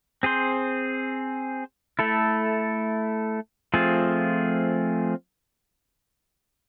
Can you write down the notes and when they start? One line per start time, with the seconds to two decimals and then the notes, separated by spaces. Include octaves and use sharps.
0.23 C4 G#4 C5
1.99 A3 E4 A4
3.74 F3 A3 C4 F4 G#4